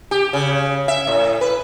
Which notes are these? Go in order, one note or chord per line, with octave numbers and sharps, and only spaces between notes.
G4
C#3
E5
A2
B4